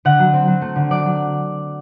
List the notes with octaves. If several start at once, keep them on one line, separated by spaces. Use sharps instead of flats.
D3 F#5
F#3
C4
F#3
A3
D3
F#3 D5
F#3